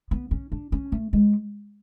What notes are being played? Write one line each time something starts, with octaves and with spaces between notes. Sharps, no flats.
B3
C#4
D4
C#4
A3
G#3